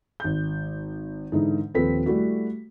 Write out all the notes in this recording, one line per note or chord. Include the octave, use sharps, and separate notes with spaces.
G#1 G6
G#2 D3 E3 D#4
D#1 F3 C4 A4 B4 B6
G3 A3 E4 F#4